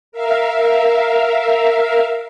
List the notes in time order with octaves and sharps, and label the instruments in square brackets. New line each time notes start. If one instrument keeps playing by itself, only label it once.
[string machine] A#4 E5 F5